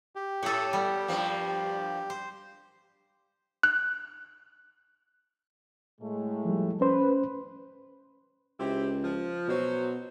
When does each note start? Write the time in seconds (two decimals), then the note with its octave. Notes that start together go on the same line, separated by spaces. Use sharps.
0.16 G4
0.43 A2 A4 C#5
0.73 G3 B3
1.08 G2 F3 A#3
2.10 C5
3.63 F#6
6.01 A2 G#3 A3
6.45 F3 G3
6.81 C#4 B4 C5
8.60 C#2 C4 E4 G4
9.04 F3
9.48 B2 F#3 C5